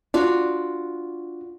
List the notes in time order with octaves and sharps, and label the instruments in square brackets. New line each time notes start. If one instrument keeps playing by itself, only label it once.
[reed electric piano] D4 [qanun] F4 F#4